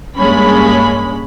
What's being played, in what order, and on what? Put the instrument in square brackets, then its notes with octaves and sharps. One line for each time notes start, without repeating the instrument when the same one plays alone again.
[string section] G2 G#3 A#3 C#4 B5